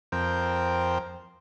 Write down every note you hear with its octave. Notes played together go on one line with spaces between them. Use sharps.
F2 C4 A#4 G5